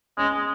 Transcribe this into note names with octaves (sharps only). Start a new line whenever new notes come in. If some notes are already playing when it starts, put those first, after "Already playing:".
G#3 C#4